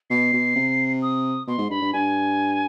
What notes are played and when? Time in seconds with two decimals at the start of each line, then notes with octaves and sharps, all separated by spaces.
0.10 B2 C7
0.33 B2
0.56 C3
1.02 D#6
1.47 B2 C6
1.58 G#2
1.70 G2 B5
1.81 G2
1.93 G2 G#5